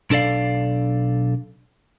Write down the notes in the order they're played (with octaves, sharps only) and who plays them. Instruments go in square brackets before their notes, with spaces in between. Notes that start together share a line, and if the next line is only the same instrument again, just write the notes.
[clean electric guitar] B1 D4 A4 D5 F5